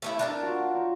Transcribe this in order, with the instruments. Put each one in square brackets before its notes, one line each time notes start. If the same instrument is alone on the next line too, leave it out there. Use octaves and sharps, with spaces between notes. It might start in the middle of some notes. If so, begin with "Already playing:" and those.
[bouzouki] A3 C#4 E4
D4 A#4 A5
[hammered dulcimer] F4 F#4
D#4 C#6